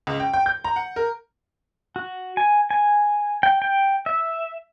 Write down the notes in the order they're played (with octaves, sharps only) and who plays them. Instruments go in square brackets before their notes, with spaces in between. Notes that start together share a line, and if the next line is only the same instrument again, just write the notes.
[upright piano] C#2
G5
G5
G6
A#5
F#5
A#4
[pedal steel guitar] F#4
G#5
G#5
G5
G5
E5